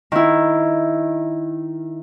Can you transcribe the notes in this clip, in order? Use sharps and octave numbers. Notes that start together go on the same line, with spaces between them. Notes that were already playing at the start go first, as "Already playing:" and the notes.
D#3 E4